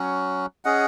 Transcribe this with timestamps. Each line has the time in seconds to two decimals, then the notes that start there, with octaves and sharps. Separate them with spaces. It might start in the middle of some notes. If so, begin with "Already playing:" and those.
Already playing: F#3 C#4 F#4
0.65 C#4 G#4 D#5 F#5